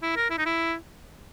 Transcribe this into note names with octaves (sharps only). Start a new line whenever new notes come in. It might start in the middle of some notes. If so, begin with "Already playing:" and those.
E4
A#4
E4
D#4
E4